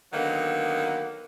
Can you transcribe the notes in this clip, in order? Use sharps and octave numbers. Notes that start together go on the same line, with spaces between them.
D3 D#3 F#3 A#3 B3